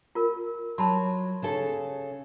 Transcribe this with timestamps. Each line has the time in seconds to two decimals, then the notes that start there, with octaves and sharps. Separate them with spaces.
0.15 F4 A#4
0.78 F#3 A5 B5 C6
1.42 C#3 A4